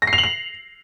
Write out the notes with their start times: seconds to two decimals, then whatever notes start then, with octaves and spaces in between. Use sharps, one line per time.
0.02 A#6
0.07 C7
0.13 F7
0.18 F#7
0.24 F7